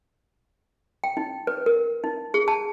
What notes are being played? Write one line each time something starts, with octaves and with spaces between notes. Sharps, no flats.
G5
D#4
B4
A#4
D#4
G#4
A5